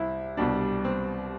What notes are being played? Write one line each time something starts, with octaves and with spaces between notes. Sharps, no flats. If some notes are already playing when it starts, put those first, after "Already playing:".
Already playing: C2 C3 E4
C2 B2 G3 D4
C4